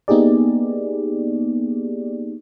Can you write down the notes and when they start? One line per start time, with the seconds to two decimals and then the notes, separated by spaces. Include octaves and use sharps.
0.08 A#3 B3 D#4 G4 G#4 D5